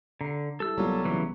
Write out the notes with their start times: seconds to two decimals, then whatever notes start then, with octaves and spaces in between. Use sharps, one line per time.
0.21 D3 A#5 C7
0.60 G3 E4 A4 E6
0.78 C2 F#3 G3 A#3 B3 F4
1.05 C#3 E3